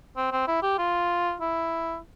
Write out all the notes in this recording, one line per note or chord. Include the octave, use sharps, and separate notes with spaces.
C4
C4
E4
G4
F4
E4